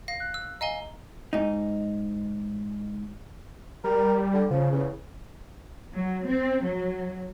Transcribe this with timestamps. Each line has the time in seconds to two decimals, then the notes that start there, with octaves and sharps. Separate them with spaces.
0.08 F5 A#6
0.20 F#6
0.34 E6
0.61 D#5 F5 G#5 A#5 G7
1.33 G#2 D#4
3.84 G3 A#4
4.34 D3
4.51 C#3 F3
4.72 E2 C#3
5.93 F#3
6.26 C4
6.64 F#3